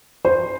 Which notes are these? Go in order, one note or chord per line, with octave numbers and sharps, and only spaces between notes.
C5